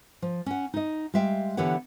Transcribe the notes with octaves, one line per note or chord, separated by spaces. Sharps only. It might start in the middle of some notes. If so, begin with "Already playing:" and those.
F3
C#4 F#5
D#4 D#5
G3 G#3 E5 F5 G5
D3 E3 B3 G4 C#5 F#5